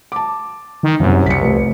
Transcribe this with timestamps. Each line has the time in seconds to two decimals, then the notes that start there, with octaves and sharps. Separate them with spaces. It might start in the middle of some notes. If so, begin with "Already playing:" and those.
0.12 A5 D6
0.83 D#3
1.00 F#1 C2 F#2
1.26 C2 B6 C#7
1.42 F1